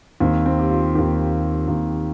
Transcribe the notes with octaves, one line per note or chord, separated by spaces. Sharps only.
D#2 D#3 C4
C4
G4
F4
D#2 D#3 G4
D#2 D#3